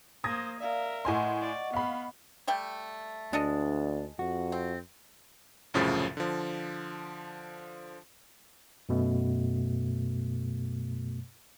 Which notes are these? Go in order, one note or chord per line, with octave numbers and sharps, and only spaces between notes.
A#3 C5 D#6 G#6 A#6
A#4 D5 E5 F5
A2 D#5 F#5 G#5 C6 C#6
D5
B3 F5 B5
G3 A3 G5
D2 G#3 D4 A4 D#5
F2 F#4
C4
C2 F#2 A2 C#3 F3 A6
D3 F3
F#2 B2 A3